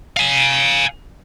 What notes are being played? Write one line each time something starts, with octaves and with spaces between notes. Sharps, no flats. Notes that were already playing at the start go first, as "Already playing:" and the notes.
F5 G#5